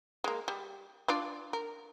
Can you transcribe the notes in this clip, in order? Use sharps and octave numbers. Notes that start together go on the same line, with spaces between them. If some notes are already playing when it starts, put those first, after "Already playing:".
G#3 A#3
G3
D4 F4 D5
A#4